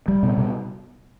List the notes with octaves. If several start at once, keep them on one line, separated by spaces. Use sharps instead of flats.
G3
B2
B2